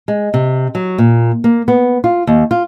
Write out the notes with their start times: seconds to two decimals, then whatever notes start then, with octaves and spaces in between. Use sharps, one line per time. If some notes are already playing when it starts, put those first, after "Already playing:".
0.08 G#3
0.34 C3
0.75 F#3
0.98 A#2
1.44 A#3
1.68 B3
2.04 F4
2.27 D#2
2.51 F4